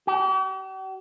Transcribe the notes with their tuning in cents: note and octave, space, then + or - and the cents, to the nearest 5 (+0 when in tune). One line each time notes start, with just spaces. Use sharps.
G4 -45